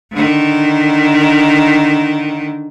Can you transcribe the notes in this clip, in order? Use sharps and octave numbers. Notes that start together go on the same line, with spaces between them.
D3 D#3